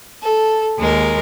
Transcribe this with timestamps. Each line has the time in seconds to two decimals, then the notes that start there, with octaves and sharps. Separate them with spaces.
0.22 A4
0.79 D#2 G#3 A#4